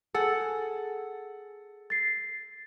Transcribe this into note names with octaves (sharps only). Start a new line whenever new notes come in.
G#4 A4 F#5 E6 A6 C#7
A6 C7